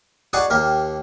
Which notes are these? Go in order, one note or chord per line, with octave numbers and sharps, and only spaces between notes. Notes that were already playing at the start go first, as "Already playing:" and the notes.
D#4 F#4 G#4 D5 C#6 D6
D#2 A#3 G4 A#4